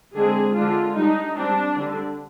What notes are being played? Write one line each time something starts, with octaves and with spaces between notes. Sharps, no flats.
D3 G#3 C4 G#4
D3 G#3 D4 F4
G3 D4 D#4
G3 C4 D4
D3 G3 D4